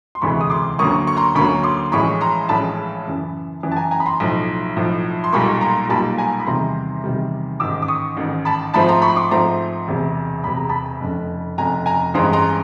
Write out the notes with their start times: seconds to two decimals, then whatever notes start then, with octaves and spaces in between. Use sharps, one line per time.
0.15 C6
0.22 E1 D2 C3 E3 G#3 B5 C#6
0.41 D#6
0.50 C6 D6
0.79 D2 D3 F#3 A#3 C#4 C#6 D#6
1.07 C#6
1.17 A#5 C6
1.35 D2 D3 F#3 A#3 C#4 B5 C#6
1.63 C6 D6
1.92 A#1 A2 E3 G#3 C#4 B5 C#6
2.21 A#5 C6
2.49 A#1 A2 E3 G#3 C#4 A5 B5
3.06 F#2 C#3 E3
3.63 F#2 C#3 E3
3.72 A5
3.76 G#5 A#5
3.91 G#5 A#5
4.00 B5
4.06 A#5 C6
4.20 B1 A2 F3
4.76 B1 A2 F3
5.24 C6
5.33 B1 A#2 G3 A#3 B5 C#6
5.61 A#5 C6
5.89 B1 A#2 G3 A#3 A5 B5
6.18 G#5 A#5
6.40 B5
6.46 E2 C3 D#3 G3 A#5 C6
7.04 E2 C3 D#3 G3
7.60 A1 G#2 D#3 D6 E6
7.82 D6
7.88 C#6 D#6
8.17 A1 G#2 D#3
8.45 A5 B5
8.74 G#2 F3 A3 C4 A5 B5
8.88 A#5 C6
9.02 B5 C#6
9.17 C6 D6
9.31 G#2 F3 A3 C4 A#5 C6
9.88 E1 E2 C3
10.44 E1 E2 C3 B5
10.56 A#5
10.69 A5 B5
11.01 F1 F2 C#3
11.58 F1 F2 C#3 G#5 A#5
11.86 G#5 A#5
12.14 A1 G2 E3 G#3 C4 A#5 C6
12.33 A#5 C6